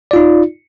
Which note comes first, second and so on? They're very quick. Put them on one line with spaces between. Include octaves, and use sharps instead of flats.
D5 F4 D#4